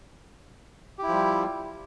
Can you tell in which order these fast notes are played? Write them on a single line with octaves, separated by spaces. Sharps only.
G4 E4 F3 G3